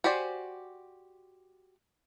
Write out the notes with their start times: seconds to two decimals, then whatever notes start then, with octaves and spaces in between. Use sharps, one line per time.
0.04 F#4 G4 C5 D5 G#5